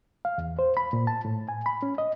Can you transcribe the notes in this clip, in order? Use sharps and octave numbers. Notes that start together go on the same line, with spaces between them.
F5
E2
C5
B5
A#2
A5
A2
G#5
B5
C#4
D#5